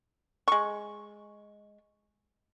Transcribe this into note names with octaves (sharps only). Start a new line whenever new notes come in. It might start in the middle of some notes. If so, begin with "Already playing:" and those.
G#3 C#6